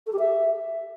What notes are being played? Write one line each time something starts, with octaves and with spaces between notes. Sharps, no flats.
A4
G4
E5